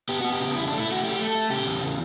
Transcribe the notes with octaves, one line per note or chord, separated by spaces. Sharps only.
B3 G4
B3 F#4
G4
C#3
E2 E4
D4
A3
E4
A3 F#4
A3 G4
A3
A4
A3
C#3 G4
E2
C#3